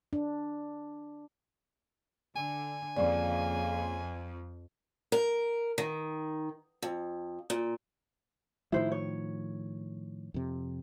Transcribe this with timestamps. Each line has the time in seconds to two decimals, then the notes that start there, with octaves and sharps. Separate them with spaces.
0.13 D4
2.36 D3 G#5
2.97 F2 C#3 A#3 D5
5.12 A#4
5.78 D#3
6.82 F2
7.50 A#2
8.72 A2 D#3 F3 E4 C5
8.92 C#5
10.34 F2 C3